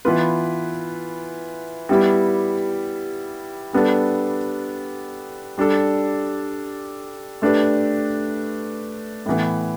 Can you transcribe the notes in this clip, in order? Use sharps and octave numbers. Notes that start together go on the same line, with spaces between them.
E3 B3 F4 B4
G3 B3 E4 G4
G3 B3 D4 A4
G3 D4 A4
A3 D4 G4 B4
A2 E3 B3